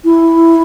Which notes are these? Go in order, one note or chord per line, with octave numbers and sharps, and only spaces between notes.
E4